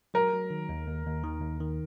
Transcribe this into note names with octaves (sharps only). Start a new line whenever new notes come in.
F#3 A#4
F#3
D#3
D#2
D#2
D#2
D#3
D#2
D#3